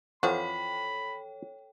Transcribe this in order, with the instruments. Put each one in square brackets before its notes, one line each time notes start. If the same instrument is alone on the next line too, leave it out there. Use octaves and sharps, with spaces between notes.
[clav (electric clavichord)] F2 E3 F3 [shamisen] F#4 [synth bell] A4 C#5 G5 [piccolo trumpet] B5